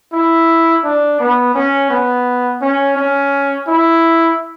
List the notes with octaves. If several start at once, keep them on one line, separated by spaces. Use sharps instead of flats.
E4
D4
B3
C#4
B3
C#4
C#4
E4